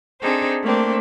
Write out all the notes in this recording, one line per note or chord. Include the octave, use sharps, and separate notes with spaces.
C4 D4 D#4 G#4 A4 C5
A3 A#3 C4 D4